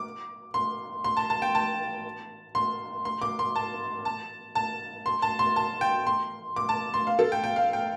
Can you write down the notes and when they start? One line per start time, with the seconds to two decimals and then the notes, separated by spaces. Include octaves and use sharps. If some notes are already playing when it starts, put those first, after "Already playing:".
Already playing: D6
0.54 C6
1.04 C6
1.17 A5
1.30 A5
1.42 G5
1.55 A5
2.55 C6
3.05 C6
3.22 D6
3.39 C6
3.56 A5
4.05 A5
4.55 A5
5.06 C6
5.22 A5
5.39 C6
5.56 A5
5.81 G5
6.07 C6
6.56 D6
6.69 A5
6.94 C6
7.07 F5
7.19 A4
7.32 G5
7.44 G5
7.56 F5
7.73 G5